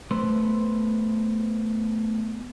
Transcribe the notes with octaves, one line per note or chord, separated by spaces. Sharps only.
A3 B3 B4 C5